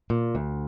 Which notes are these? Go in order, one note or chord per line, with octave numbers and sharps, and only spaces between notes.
A#2
D2